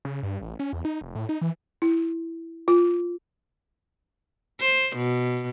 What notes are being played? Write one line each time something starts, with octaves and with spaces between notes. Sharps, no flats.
C#3
G2
A1
C#4
E2
D#4
F1
A2
D#4
E3
E4
F4
C5
B2